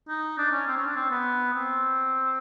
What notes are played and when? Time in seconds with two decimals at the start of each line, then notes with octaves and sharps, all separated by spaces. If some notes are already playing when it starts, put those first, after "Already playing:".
0.09 D#4
0.38 D4
0.52 C#4
0.67 C4
0.77 C#4
0.86 D4
0.96 C4
1.10 B3
1.54 C4